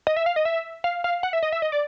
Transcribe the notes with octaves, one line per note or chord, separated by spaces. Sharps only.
D#5
E5
F5
D#5
E5
F5
F5
F#5
E5
D#5
E5
D#5
D5